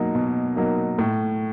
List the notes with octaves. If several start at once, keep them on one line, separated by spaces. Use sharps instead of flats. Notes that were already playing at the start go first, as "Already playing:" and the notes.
Already playing: B2 F#3 A#3 D#4
B2
F#3 A#3 D#4
A2